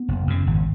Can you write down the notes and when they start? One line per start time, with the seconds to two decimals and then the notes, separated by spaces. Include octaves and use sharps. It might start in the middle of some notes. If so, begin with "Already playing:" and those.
Already playing: B3
0.08 F#1
0.27 F#2 C#3
0.47 G#1